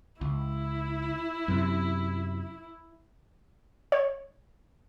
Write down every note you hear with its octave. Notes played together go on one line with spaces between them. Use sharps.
C#2 E4
F#2 C3
C#5